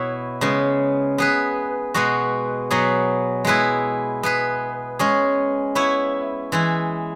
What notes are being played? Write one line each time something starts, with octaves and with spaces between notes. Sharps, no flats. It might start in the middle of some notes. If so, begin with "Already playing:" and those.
Already playing: B2 B3 E4 C#5
C#3 G#3 B3
B3 G#4 B4
B2 G#3 B3 F#4
B2 F#3 B3 G#4
G#3 B3 E4 G#4 B4
B3 G#4 B4
G#3 C#4 G#4
B3 E4 C#5
E3 G#3 E4